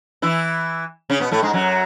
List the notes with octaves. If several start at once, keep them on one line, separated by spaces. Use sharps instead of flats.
E3 E4
C#3 C#4
B2 B3
A2 A3
G#2 G#3
F#2 F#3